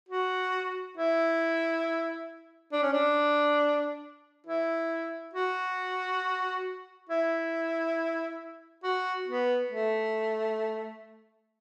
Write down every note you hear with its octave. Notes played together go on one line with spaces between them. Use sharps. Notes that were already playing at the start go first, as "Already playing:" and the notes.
F#4
E4
D4
C#4
D4
E4
F#4
E4
F#4
B3
A3